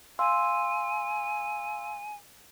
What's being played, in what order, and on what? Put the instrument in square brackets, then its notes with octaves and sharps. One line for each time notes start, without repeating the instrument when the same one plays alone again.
[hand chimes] F5 C6 E6 [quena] G#5